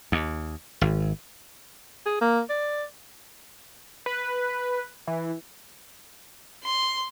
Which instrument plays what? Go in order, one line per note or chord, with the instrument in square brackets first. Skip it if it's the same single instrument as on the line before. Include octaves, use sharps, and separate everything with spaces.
[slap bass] D#2
G#1
[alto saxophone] G#4
A#3
D5
[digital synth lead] B4
E3
[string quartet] C6